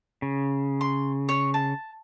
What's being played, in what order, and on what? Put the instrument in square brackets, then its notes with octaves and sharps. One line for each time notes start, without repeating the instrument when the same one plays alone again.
[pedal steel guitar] C#3
[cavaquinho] C6
C#5
A5